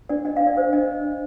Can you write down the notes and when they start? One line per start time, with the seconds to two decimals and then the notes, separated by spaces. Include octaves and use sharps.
0.09 D4 D5
0.25 D4 D#5
0.37 F5
0.41 D4
0.47 D5
0.57 C5 D5
0.73 D4 D#5